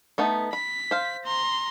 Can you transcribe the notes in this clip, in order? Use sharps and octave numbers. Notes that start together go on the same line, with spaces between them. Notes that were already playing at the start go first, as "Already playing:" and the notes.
A3 B3 D#4
B5 B6
C5 F5
A#5 C6